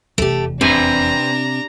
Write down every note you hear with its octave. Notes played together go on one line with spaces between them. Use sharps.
F1 E2 A3 G4
C3 C4 D4 B4 G#5 A#5